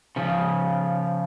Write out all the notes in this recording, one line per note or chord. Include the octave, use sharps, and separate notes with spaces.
C#3 F3